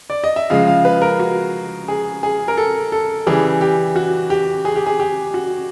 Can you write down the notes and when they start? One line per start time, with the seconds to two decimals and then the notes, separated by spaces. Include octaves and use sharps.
0.10 D5
0.24 D#5
0.36 E5
0.50 C#3 F3 G#3 F5
0.67 F5
0.85 B4
1.02 A#4
1.19 F#4
1.88 G#4
2.23 G#4
2.48 A#4
2.58 A4
2.92 A4
3.26 C#3 E3 G3 G#4
3.61 G4
3.96 F#4
4.30 G4
4.65 G#4
4.76 G4
4.86 G#4
5.00 G4
5.34 F#4